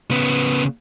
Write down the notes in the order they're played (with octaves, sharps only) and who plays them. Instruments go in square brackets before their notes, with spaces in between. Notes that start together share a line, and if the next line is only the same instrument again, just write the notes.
[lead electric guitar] C#3 B3